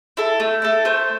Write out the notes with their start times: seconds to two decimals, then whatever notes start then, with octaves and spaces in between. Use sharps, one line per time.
0.17 E4 A4
0.40 A3
0.62 E4 A4
0.85 A3 C5